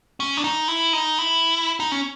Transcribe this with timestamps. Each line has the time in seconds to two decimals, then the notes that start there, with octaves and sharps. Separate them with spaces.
0.20 C#4
0.37 D4
0.44 D#4
0.68 E4
0.93 D#4
1.19 E4
1.80 D#4
1.92 C#4